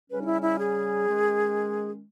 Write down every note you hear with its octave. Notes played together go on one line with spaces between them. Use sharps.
C#3 G3 C#4 B4
D#4
E4
E4
G#4
D#3 G#3 C#4